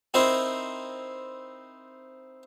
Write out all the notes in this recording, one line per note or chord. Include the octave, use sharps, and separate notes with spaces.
C4 D#4 E4 A#4 C5